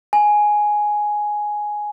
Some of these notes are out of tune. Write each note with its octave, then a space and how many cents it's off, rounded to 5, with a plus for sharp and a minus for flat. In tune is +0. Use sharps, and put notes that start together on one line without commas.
G#5 +5